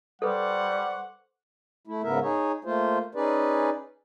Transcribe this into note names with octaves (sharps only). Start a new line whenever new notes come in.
G3 A4 B4 C5 F#5 C#6 D6
A3 E4
G#2 C#3 B3 A#4 E5
D#4 G#4 C#5
A3 A#3 F4 C5
C#4 D#4 G#4 B4 D5